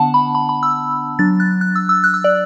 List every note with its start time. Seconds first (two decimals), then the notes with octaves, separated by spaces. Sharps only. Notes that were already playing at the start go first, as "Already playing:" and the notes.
Already playing: D3 B3 D4 F#5 A5
0.14 B5
0.35 B5
0.49 B5
0.63 E6
1.19 F#3 D4 A6
1.40 F#6
1.61 F#6
1.76 E6
1.89 E6
2.04 F#6
2.14 E6
2.24 D5